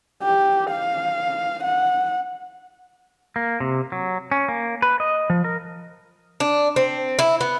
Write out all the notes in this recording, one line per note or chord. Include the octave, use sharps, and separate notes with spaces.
G4
F5
F#5
A#3
C3
F#3
C#4
A#3
B4
D#5
F3
A#4
D4
C4
E4
B3